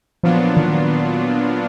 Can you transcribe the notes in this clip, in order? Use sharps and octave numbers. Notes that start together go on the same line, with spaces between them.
A#2 F3 F#3 B3 D4 F4
D#3